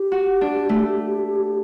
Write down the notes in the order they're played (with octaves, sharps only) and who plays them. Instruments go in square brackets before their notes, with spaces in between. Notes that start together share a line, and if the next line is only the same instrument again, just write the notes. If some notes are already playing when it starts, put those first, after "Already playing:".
Already playing: [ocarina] G4
[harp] F#4
D4
A3